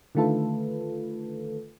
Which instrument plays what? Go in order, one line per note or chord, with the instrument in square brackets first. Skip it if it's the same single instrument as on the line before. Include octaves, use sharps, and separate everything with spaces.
[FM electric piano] D3 D#3 A3 F4 A4 B4